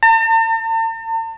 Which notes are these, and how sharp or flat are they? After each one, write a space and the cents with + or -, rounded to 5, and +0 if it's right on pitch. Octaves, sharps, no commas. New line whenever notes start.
A5 +45